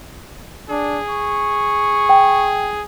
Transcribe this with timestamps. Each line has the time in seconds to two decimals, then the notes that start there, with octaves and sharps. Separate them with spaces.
0.70 D4 G#4
1.10 C#6
2.09 G5